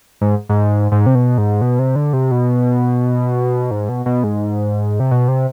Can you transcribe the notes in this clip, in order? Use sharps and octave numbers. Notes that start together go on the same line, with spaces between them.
G#2
G#2
G#2
C3
B2
G#2
B2
C3
D3
C3
B2
G#2
B2
B2
G#2
C3
B2
C3